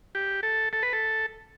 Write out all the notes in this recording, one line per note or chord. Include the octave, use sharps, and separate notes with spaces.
G4
A4
A4
B4
A4